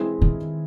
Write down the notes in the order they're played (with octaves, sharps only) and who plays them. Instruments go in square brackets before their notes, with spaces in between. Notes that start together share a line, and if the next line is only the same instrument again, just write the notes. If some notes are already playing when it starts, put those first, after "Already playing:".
Already playing: [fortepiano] E3 G#3 C4 E4 G#4
[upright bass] D#3